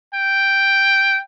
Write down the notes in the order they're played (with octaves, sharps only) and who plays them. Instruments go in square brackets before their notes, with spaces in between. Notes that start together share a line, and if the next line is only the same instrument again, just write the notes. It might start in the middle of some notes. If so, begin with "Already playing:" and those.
[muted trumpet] G5